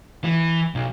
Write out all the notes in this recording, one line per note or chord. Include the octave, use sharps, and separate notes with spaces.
E3
B1